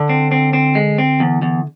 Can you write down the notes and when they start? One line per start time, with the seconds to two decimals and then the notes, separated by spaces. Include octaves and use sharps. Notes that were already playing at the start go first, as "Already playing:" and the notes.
Already playing: D3
0.09 C4
0.32 C4
0.53 C4
0.75 G#3
0.98 C4
1.20 E2
1.42 E2